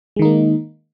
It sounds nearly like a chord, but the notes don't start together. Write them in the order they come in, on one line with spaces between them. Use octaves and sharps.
G#3 D#3 D#4 A#3